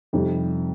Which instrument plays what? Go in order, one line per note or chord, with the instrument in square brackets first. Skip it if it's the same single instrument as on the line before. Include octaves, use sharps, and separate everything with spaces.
[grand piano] F2 C3 G3 D#4